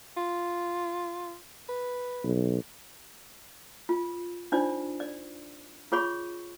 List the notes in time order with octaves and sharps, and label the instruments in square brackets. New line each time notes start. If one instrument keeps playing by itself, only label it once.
[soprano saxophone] F4
B4
[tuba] B1
[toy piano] F4
D4 D#4 F4 C5 D5
D5
F4 G#4 C#5 B5 C#6